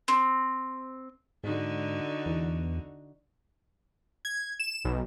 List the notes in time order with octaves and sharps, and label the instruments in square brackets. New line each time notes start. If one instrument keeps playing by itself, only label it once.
[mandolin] C4
[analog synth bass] G#2 [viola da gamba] D3 D#4 F#4
[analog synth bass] E2
[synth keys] G#6
E7
B1